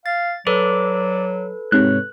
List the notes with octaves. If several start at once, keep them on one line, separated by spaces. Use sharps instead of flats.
F5 A6
F#3 A4 B4 D5
G#2 C3 C#5 F#6